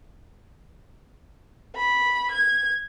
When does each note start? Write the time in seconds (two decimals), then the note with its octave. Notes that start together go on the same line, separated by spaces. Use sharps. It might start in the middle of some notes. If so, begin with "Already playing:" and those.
1.76 B5
2.31 G#6